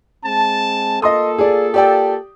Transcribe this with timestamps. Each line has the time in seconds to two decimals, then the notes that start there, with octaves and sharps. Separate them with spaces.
0.24 G#3 C4 A5
1.02 A#3 F4 A4 D#5 C6 D#6
1.38 G#4 D5
1.74 G4 D5 G5